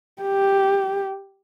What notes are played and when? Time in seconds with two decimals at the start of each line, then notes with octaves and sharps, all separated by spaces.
0.22 G4